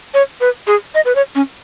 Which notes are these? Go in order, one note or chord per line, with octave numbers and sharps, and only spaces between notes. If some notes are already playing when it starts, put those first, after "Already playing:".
C#5
B4
G#4
D#5
B4
C#5
C#4